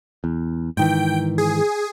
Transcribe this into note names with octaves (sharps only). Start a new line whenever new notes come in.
E2
G#2 D#3 E3 G5
G#4